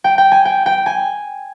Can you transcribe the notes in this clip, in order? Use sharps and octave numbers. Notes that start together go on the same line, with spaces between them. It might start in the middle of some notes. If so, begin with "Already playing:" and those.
G5
G5
G#5
G5
G5
G#5